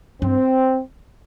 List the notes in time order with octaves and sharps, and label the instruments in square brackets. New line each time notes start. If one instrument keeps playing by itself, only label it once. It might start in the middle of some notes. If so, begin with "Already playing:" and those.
[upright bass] G2 [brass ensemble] C4